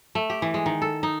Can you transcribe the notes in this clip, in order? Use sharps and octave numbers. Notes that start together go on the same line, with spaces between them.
A3
G4
E3
G#3
D#3
A4
D#4